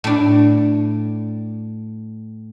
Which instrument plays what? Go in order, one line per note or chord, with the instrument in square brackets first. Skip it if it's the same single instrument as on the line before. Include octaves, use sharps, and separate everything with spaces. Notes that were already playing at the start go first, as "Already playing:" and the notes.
[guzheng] A2 D4